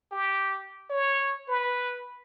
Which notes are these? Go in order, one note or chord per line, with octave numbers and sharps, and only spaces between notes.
G4
C#5
B4